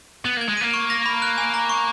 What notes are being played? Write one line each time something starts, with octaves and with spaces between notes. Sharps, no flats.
B3 F#7
A#3 G#6
G#3
A#3 D#7
C#6
A#6
B5
F#6
G#5
A#5
C#6